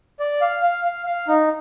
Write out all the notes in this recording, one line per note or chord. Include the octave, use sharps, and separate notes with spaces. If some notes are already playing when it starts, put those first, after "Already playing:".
D5
F5
F5
F5
F5
D#4